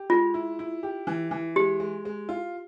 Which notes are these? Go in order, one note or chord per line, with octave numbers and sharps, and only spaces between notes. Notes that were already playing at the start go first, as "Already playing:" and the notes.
Already playing: G4
G#3 F4
E4
E4
G4
E3
E3
G#3 G4
G#3
G#3
F4